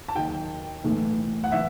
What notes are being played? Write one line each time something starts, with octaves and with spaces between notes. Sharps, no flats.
A5
D#2 D#3 F#3 G5
B1 A2 E3 A3
F#5
E3 E5